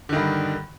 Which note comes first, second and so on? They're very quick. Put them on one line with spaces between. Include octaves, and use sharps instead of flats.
D3 D#3 G2